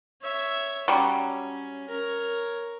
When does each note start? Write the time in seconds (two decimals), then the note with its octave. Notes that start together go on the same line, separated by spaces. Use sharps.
0.21 C#5 E5
0.88 F#3 G3 C#4
1.89 A#4 C#5